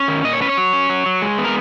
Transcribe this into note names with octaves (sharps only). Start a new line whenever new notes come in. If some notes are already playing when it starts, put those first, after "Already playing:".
Already playing: C#4
D#3
A#2 D#5
C#5
C#4 B4
C#5
F#3
C#4
F#3
F#3
G#3
B3
A#4